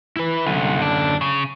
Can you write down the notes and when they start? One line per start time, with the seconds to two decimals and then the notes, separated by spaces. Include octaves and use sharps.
0.16 E4 B4
0.46 C2 F#2 D3
0.82 D4
1.21 C#3